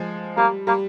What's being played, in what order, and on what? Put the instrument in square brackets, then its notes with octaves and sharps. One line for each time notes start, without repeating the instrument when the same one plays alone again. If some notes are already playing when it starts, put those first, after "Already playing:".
Already playing: [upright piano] F3 G#3
[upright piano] G3 [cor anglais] A#3
[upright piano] G3 [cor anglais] A#3